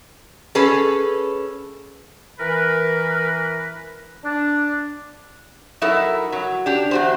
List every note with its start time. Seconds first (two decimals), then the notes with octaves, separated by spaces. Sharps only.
0.55 C#4 G#4 A4 B4
2.39 E3 A#4 B4
4.24 D4
5.82 F#3 D#4 E4 A4 A#4
6.32 F#3
6.66 D4 G4
6.91 E2 F#4 C5